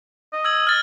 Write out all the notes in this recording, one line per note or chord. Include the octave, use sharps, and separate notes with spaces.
D#5
E6 G#6 F#7
F6 A6